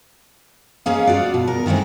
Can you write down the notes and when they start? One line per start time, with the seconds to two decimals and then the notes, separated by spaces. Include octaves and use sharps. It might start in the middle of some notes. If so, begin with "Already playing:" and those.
0.86 G#3 A#3 C#4 G#4 F5
1.07 F4 F#4 D5
1.34 B2
1.48 A#4
1.66 D#3 E3 G#3 A3 C4